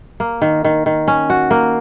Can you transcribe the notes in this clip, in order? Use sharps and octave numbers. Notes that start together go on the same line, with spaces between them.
A#3
D#3
D#3
D#3
C#4
F#4
A#3